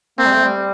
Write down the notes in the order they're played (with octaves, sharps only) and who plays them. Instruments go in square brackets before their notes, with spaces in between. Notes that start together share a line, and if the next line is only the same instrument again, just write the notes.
[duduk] A#3 [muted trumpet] C4
[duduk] G3
A3
G3